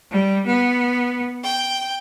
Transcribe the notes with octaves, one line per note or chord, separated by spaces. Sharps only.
G3
B3
G5